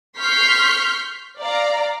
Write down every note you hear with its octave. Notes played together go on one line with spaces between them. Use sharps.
C6 C#6 F6 G6 B6 C7
D5 F5 A#5